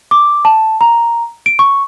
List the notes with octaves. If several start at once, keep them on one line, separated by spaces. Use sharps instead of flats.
D6
A5
A#5
D7
C#6